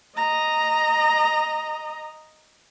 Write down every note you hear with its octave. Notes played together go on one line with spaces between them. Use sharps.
D#5 A#5